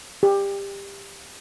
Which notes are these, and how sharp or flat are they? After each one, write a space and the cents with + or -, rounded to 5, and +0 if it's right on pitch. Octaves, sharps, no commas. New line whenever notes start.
G4 +20